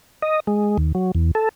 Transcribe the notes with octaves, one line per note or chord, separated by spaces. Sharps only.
D#5
G#3
D#2
F#3
E2
A4